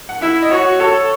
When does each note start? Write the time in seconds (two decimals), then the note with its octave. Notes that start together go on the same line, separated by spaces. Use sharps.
0.09 F#5
0.21 E4 E5
0.42 D#5
0.51 F#4 C#5
0.80 A4 C#5